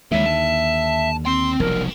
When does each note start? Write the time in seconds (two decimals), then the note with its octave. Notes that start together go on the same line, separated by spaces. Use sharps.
0.11 D#2 D3 G#3 C#5 E5
0.26 A5
1.25 C4 G5 C6
1.60 F1 B1 F3 G3 A#4